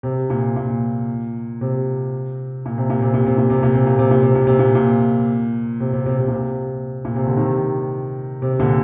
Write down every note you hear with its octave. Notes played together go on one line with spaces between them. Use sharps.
C3
A#2
A#2
C3
A#2
C3
A#2
C3
A#2
C3
A#2
C3
A#2
C3
A#2
C3
A#2
C3
A#2
C3
A#2
A#2
C3
C3
C3
C3
A#2
C3
A#2
C3
D3
C3 D#3
C3
A#2 D3